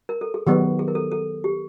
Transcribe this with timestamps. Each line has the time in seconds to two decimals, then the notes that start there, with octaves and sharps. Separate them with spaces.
0.09 A#4
0.21 A4
0.34 G#4
0.47 D#3 F#3 B3 G4
0.79 G#4
0.88 A#4
0.95 A4
1.12 A4
1.44 G4